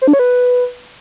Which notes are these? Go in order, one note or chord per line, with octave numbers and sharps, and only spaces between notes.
C5
D4
C#5
B4